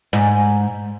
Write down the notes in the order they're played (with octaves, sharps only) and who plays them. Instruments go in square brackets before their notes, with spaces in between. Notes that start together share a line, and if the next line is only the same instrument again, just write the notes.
[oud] G#2